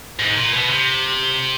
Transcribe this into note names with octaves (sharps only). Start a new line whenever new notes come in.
G#2
A#2
B2
C3